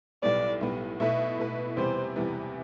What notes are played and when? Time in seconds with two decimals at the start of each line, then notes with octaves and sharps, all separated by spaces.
0.23 B1 A2 G3 B3 D5
0.61 B1 A2 G3 B3
1.00 B2 A3 E4 B4 E5
1.38 B2 A3 E4 B4
1.76 E2 C3 E3 G3 B3 C5
2.16 E2 C3 E3 G3 B3